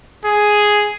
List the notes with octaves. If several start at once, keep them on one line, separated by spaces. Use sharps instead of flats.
G#4